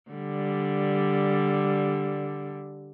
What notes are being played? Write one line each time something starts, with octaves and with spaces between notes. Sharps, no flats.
D3 G3